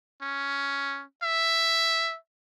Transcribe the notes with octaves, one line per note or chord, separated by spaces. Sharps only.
C#4
E5